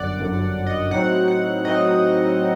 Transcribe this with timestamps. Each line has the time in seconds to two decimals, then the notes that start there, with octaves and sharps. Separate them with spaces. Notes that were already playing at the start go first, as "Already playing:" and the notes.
Already playing: G1 F#2 D3 D5 F#5
0.17 G1 F#2 D3
0.66 D#5
0.91 A2 F#3 C4 D#4 F#5
1.28 F#5
1.64 A2 F#3 C4 D#4 D#5